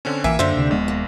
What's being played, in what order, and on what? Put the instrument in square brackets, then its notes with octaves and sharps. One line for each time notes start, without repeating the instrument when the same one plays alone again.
[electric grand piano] D3 C4 C#4
[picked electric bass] A#1 E3 [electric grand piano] A#3 E5 G#5 [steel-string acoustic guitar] G5
[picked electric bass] F#2 [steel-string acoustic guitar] D3 D#3 D4 [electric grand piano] A#3 C5 E5
[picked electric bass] D2 C3
[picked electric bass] D#1 G#3 B3 [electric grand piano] A#1
[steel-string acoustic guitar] A#3